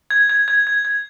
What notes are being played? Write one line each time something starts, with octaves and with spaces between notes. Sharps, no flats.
G#6
G#6
G#6
G#6
G#6